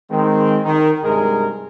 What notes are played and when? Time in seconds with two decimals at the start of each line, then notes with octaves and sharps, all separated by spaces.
0.11 D#3 G#3 C4
0.64 D#3
1.03 G2 C3 G#3 D#4 G#4 A#4